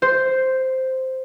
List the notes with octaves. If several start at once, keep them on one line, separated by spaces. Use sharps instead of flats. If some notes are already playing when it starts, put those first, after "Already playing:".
C5